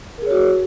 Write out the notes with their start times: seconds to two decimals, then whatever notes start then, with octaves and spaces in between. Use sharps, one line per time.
0.18 A#4
0.22 G#4
0.26 C#5
0.31 F#4